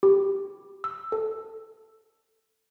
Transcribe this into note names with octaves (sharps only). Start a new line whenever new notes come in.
G4
E6
A4